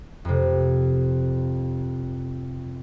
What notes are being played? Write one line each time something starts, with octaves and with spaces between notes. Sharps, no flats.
F2 C3